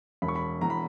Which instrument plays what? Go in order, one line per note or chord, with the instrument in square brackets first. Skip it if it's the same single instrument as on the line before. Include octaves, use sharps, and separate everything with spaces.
[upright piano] E1 [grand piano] B5
[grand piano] C#6
B5
[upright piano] E2 [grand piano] A#5
[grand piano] B5